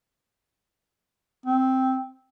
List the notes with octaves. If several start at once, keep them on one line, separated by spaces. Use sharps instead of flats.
C4